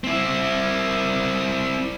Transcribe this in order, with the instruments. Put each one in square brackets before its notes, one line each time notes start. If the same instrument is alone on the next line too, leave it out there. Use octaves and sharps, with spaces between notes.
[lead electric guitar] C4 E4